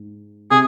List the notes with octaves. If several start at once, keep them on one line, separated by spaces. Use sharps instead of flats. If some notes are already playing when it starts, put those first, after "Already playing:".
Already playing: G#2
C3 G#4